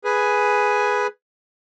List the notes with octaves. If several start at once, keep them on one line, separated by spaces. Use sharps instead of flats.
G#4 B4 G#5